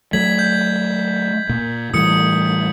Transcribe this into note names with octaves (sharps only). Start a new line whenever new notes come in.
F#3 A3 G#6 B6 F#7
G6
A#2
A2 E3 G3 D#6 C#7